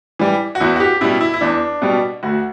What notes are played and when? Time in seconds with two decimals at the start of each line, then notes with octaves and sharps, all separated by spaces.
0.19 E3 G3
0.55 F#4
0.60 E2 E4
0.76 F#4
0.80 G4
1.01 B2 G3 E4
1.21 E4
1.34 E4
1.41 E2 D4
1.82 B2 G3
2.23 D2 F#4